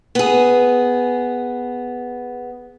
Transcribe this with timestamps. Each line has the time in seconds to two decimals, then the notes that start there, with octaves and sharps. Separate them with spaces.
0.15 B3 G#4